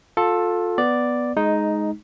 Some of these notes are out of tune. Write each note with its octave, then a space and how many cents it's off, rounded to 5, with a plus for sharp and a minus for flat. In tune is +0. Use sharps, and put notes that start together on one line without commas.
F4 +25 A4 +0
B3 +0 D5 +0
G#3 +15 D#4 +0